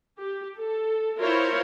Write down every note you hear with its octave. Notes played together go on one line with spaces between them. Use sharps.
G4
A4
E4 F4 A#4 C5 C#5